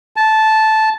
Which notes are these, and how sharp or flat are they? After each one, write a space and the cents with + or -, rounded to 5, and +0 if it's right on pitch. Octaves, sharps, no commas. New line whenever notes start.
A5 -10